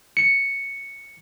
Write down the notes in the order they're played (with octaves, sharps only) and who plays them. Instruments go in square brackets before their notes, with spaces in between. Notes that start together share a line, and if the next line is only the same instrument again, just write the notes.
[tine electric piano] C#7